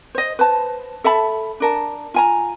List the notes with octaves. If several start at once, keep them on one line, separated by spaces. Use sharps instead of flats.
C5 D#5
B4 C5 A5
A4 E5 A5 B5
D4 A#4 A5
F4 G#5 A#5